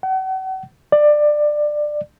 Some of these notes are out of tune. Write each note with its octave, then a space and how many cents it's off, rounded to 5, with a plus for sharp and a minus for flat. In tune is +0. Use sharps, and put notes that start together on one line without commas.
F#5 +40
D5 +20